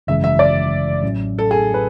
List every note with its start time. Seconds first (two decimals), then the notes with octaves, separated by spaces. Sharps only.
0.07 G#1 F#2 C#3 E3 G#3 E5
0.24 E5
0.39 D5
1.03 A1 A2 F#3 C#4
1.39 A4
1.51 G#4
1.74 B4